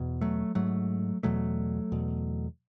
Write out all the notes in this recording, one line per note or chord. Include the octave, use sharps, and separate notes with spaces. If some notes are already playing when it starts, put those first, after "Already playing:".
Already playing: E2 B2
F#3 A3
G#2 F#3 A3
E2 B2 F#3 A3
E2 B2